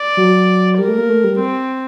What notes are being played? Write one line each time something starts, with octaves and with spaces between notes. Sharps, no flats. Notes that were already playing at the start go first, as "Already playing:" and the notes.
Already playing: D5
F#3
G3 A#4
A3
A#3
A3
G3
C4